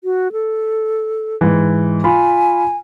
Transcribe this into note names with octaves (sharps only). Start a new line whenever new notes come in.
F#4
A4
G#2 E3
F4 G#5 B5